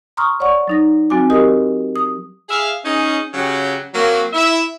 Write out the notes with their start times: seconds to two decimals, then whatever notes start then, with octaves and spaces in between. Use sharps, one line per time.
0.17 A#5 C6 C#6 D#6 F6
0.40 C#5 D5 F#5 C#6
0.68 F#3 D#4 A#6
1.10 F#3 C4 F#4 G#5 D6
1.30 G4 A#4 D#5 D#6
1.96 D#6
2.49 G#4 E5 F5
2.84 C#4 D#4 G#4
3.34 C#3 F#3 G4
3.94 F#3 A#3 C4
4.33 E4 E5